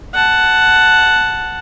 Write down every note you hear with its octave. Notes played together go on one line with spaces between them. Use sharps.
F#5 A5